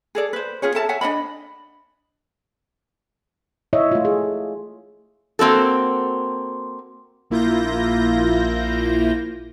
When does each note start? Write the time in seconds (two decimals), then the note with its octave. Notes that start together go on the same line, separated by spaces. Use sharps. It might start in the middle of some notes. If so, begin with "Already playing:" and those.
0.15 G#4 A4 D5
0.33 B4 C5
0.62 C#4 F4 G#4 C#5
0.75 A4 E5 A5 A#5
0.89 C#5 E5 F#5 G#5
1.01 D4 D5 D#5 B5
3.73 E4 C#5 D#5 E5
3.92 A3 F4
4.05 G#4
5.39 A#3 C4 F#4 A4
7.30 A#1 A#3 E4 F4 G6 A#6